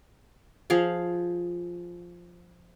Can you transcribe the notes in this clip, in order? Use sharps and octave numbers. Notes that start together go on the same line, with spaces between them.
F3 G#4 F5